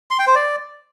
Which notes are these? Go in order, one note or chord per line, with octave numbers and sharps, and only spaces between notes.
C6
G5
C5
D5